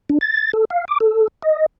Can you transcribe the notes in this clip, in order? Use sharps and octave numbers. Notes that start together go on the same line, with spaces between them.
D4
A6
A4
F5
D6
A4
D#5